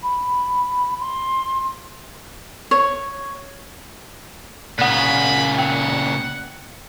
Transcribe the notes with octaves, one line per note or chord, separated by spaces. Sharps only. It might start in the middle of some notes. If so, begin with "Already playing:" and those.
B5
C6
C#5
A#2 C#3 F#5 B5 F#6
F#5 G5